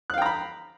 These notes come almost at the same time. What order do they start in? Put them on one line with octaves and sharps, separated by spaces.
F#6 F5 G5 A#5 B5